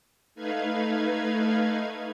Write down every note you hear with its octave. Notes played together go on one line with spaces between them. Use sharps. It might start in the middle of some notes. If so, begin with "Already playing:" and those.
A3 D#4 B4 F5 G#6